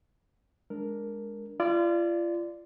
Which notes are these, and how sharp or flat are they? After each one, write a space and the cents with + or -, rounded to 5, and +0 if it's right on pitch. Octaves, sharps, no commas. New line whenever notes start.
G#3 +0 D4 -5 A#4 +0
F4 -35 D5 +5